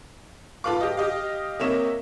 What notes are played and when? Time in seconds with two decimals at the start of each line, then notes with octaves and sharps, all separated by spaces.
0.64 F4 A4 B4 F5 D6
0.81 G4 D#5
0.97 G4 D#5 F5
1.59 C3 A#3 C#5 D#5 E5 E7